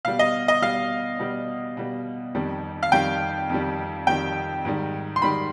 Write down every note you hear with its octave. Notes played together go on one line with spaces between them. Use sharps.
B2 G3 F5
D#5
D#5
B2 G3 F5
B2 G3
B2 G3
F2 D#3 G3
F5
F2 D#3 G3 G5
F2 D#3 G3
F2 D#3 G3 G5
G#2 D#3 G3
C6
G#2 D#3 G3 B5